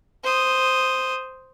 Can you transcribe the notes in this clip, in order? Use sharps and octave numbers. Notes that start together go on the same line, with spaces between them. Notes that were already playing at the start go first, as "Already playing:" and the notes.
C5 D#6